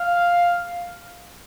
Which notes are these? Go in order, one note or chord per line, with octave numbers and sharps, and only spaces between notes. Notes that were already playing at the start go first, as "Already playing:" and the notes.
Already playing: F5